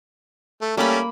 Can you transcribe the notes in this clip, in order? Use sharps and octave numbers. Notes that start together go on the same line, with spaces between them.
A3
G3 A3 A#3 C#4 B5